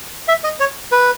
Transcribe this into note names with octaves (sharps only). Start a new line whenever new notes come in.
E5
D#5
C#5
B4